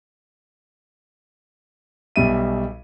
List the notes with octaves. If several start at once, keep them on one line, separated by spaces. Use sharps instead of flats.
B1 B2 G3 E5 D#7